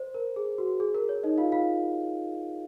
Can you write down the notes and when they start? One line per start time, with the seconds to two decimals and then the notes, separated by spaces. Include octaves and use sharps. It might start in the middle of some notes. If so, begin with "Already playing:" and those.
Already playing: C5
0.14 A#4
0.36 G#4
0.58 F#4
0.80 G#4
0.95 A#4
1.09 C#5
1.23 D#4 D#5
1.38 F4 F5
1.52 F4 F5